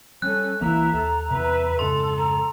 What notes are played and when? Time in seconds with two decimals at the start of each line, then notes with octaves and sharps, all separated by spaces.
0.22 G3 C#4 A4 F#6
0.61 C2 E3 A#3 E4 E5 A#5
0.92 D#2 A4
1.30 E2 C3 B4 E5
1.79 F2 G#2 C#3 A4 C6
2.17 A#5